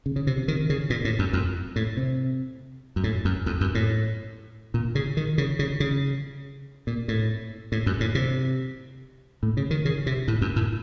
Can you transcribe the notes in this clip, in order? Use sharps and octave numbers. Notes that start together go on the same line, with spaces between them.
C#3
C#3
C3
C3
D#3
C#3
A#2
A2
F#2
F2
A2
C3
F#2
A2
F#2
F2
F#2
A2
A#2
C#3
D#3
C#3
C#3
C#3
A#2
A2
A2
F#2
A2
C3
A2
C#3
D#3
C#3
C3
A2
F#2
A2